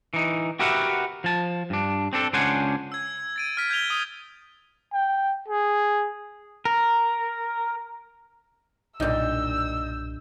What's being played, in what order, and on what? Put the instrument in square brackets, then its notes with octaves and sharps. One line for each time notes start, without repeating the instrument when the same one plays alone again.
[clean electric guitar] E3 D#4
F#4 G4 A#4 B4 E5 F#5
F3 A5
G2 D4
C4 D4 A4
C#2 C#4 D4 C5 F#5 G#5
[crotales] E6 G#6
A6 D7 D#7
F6 B6
G6 G#6 B6 D#7 F7 G7
D#6 D#7
[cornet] G5
G#4
[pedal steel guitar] A#4
[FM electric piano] B1 G6 [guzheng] G2 A#2 [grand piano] D#4 D5 D#5 [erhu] E6